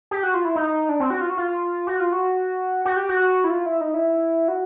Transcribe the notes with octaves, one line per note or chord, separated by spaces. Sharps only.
G4
F#4
F4
E4
D#4
D4
C4
F#4
F4
F#4
F4
F#4
F4
F#4
F#4
G4
F#4
E4
F4
E4
D#4
E4
F#4